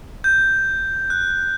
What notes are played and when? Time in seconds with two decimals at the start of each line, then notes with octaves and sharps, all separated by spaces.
0.24 G6
1.10 F#6